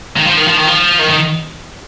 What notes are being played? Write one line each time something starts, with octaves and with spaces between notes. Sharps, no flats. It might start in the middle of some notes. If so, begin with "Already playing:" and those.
D#3
F3
D#3
F3
D#3
F3
D#3
D#3